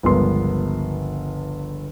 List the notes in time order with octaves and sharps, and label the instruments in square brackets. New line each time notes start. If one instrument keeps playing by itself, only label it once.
[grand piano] G1 C#2 F3 B3 A#4 C6